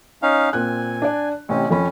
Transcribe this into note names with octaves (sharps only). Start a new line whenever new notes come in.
C#4 D#4 F5
A#2 C4 G#5 F#6
D4 D5
A1 C3 C#4
F2 F3 C#4 B5